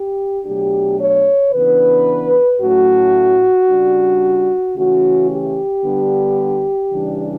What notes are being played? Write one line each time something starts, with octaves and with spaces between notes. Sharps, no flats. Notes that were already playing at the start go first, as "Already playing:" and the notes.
Already playing: G4
B2 F#3 A3 D4 G4
C#5
C#3 E3 B3 D4 B4
A2 F#3 A3 C#4 F#4
C#3 G3 D4
C#3 E3 A3 C#4 F#4
G4
D3 G3 B3 D4
C#3 E3 G3 D4